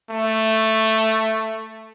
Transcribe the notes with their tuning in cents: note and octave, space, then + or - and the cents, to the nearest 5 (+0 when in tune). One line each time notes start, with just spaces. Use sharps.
A3 +5